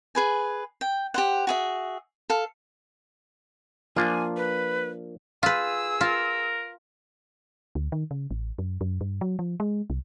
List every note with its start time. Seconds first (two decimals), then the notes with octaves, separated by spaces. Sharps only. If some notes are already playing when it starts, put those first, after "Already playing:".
0.15 G#4 B4 G#5
0.81 G5
1.14 G4 C5 F#5
1.47 F#4 G#4 E5
2.30 A4 F5
3.96 F3 A#3 D4 F4 G#5
4.37 B4
5.43 F4 G#4 B4 E6
6.01 F4 A#4
7.75 D2
7.92 D#3
8.11 C#3
8.31 A1
8.58 F#2
8.81 F#2
9.01 G2
9.21 F#3
9.39 F3
9.60 G#3
9.90 C2